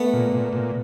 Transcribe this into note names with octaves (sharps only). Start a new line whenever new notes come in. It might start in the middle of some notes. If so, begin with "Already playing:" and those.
Already playing: A3 B3
A#2
A#2
A#2